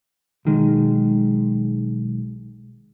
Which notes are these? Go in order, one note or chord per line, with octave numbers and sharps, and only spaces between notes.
B1 D#3 G#3